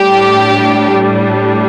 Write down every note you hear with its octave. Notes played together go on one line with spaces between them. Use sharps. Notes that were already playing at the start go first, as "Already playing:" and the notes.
Already playing: A2 G3 D4 G4